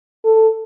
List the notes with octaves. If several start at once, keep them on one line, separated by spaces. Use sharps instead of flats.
A4